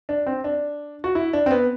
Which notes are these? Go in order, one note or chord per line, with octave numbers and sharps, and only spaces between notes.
D4
C4
D4
F#4
E4
D4
C4
B3